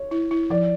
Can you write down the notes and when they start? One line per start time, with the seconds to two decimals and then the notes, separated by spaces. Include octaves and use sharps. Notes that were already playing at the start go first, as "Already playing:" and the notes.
Already playing: C#5
0.11 E4
0.31 E4
0.50 F3 D5